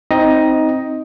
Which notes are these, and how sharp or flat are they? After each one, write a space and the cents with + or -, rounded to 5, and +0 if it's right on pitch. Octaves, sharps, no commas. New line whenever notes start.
C4 +0 D#4 +15 D#5 +5